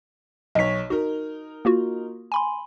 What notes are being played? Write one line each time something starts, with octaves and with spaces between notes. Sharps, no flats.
B1 C#5 D#5 B6
D#4 F#4 A#4
A#3 F4 F#4
G#5 B5 C6